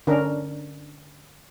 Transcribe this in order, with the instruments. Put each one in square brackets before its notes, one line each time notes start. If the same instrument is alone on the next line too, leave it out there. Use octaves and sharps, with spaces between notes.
[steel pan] D3 C#4 D4 A#4